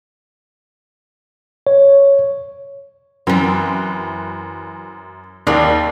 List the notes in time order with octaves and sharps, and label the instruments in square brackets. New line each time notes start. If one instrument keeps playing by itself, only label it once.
[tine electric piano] C#5
[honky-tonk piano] F#2 [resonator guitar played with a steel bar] E3 C4
[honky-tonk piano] D#2 [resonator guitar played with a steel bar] G4 G#4 D5